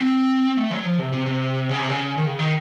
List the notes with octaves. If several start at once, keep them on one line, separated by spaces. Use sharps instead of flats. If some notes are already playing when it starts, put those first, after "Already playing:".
C4
A3
F#3
F3
C3
C3
C3
C#3
C3
C#3
D#3
C#3
D#3